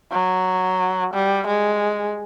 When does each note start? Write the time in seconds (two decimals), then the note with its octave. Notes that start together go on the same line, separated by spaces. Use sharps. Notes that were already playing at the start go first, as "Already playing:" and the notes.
0.12 F#3
1.14 G3
1.47 G#3